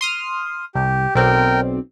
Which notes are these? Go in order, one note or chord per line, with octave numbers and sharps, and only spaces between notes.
C6 D#6 F6
C2 G4
B1 C4 A#4 D5 G5